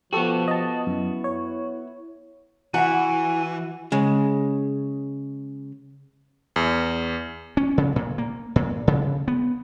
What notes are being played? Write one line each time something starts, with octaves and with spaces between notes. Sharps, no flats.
F3 B3 F#4 G4 A4 C#6
D#5 A5
F#2 E4
C#5
E3 E4 F#4 F#5 G#5
C#3 G#3
E2
C#4
C#3
A#2
A#3
A#2
C#3
B3